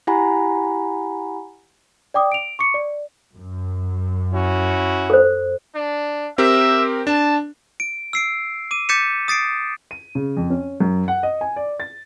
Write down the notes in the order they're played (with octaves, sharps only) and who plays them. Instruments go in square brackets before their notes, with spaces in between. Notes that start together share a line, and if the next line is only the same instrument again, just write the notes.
[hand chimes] E4 G4 F#5 G#5 A#5 B5
[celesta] D5 G5 D6 D#6
D7 F7
C#6 D6 C#7
D5
[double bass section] F#2
[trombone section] C#4 E4 F#4
[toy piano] A4 C5
[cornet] D4
[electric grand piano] C4 G4 A#4 [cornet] E5
[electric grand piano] D4 [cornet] A5
[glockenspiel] D7
E6 C7 D7
D6 D#7
D6 G6 A6 B6 C#7 E7
D#6 A6 C7 D7
[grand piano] D#7
C#3
F2
C#4
F#2
F#5
D#5
G#5
D5
A6